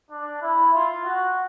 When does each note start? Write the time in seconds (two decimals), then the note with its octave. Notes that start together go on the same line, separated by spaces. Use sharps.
0.10 D4
0.41 E4
0.74 F4
1.05 F#4